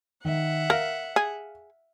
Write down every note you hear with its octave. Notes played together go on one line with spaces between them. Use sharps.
D#3 E5 F#5
A#4 F5
G#4